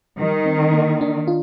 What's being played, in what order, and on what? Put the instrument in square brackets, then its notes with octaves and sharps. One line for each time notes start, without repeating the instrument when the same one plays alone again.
[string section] D#3 [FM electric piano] G3
[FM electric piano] C4
A#3
D4
F4